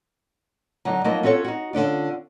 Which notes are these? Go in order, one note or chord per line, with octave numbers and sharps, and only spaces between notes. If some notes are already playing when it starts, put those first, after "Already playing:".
D3 F#3 D#4
F3 F#3 A#3 D#4 A#4 D#5
C#4 F4 F#4 A4 C#5
D#4 F#4
D3 C#4 D4 F4